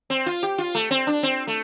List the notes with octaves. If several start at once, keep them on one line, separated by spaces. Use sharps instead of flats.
C4
F4
G4
F4
A3
C4
D4
C4
A3